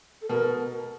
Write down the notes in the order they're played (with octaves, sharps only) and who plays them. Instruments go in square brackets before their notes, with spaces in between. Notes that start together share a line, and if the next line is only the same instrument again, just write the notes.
[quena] A4
[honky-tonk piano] B2 [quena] A#4